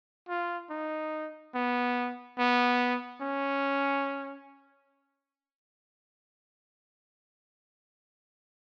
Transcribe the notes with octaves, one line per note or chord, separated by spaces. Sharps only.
F4
D#4
B3
B3
C#4